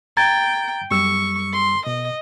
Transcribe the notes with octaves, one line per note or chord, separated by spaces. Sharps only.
G5 A#5 G#6 A6
F#2 G3 C#6 E6
C6
B2 D#5